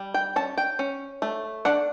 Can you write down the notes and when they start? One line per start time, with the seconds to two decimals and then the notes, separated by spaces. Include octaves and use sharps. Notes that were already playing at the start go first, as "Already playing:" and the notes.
Already playing: G3
0.14 G5
0.36 C#4 A5
0.58 G5
0.79 C#4
1.22 A3
1.65 D4 F#5